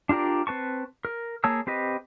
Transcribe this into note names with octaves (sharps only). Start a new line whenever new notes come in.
D4 F4 G4 A#4 D5
C4 B4 A5 C#6
A#4
A#3 G#4 C#5 A5 E6
C4 G4 B4 D#5